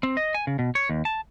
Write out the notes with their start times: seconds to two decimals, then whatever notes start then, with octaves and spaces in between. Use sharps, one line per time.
0.03 C4
0.17 D#5
0.34 G#5
0.47 C#3
0.59 B2
0.75 C#5
0.90 D#2
1.05 A5